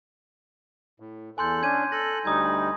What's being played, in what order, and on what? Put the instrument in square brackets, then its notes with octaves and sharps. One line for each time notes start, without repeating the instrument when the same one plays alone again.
[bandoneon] A2
[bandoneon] E2 A4 F#6 [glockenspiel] G#5 C6 G6
[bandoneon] C#4 D4 [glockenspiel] G#6 D#7
[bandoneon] A4 F#6 [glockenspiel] A#6
[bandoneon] D2 G3 D#4 [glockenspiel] D#6 G#6